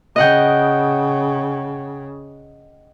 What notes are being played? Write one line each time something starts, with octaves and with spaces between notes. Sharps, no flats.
C#3 D#5 F#5 G5